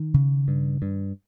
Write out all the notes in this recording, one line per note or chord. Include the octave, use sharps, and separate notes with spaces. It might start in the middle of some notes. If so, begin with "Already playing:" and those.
Already playing: D#3
C#3
G2
G2